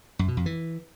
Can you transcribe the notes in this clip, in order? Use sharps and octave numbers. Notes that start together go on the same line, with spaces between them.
F#2
B2
F2
E3